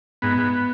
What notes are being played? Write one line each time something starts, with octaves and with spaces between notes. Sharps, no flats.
G#2 B3
G#2